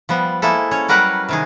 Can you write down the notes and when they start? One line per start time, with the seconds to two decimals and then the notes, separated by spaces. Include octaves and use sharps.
0.09 F3 G3 B3
0.42 G#3 A#3 E4 A4
0.71 C#4 C#5
0.88 F#3 G3 F#4 A#4 B4 F#5
1.29 C3 D#3 G#4